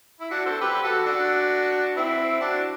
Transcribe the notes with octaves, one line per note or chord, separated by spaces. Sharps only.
E4
D4 F#4
A4 C5
G4 B4
F#4 A4
D4 F#4
C4 E4
D4 F#4